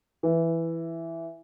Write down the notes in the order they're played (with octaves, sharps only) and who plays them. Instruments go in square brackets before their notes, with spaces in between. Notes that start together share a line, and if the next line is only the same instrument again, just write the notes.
[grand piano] E3